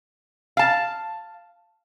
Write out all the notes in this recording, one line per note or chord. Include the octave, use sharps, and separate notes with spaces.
F5 A5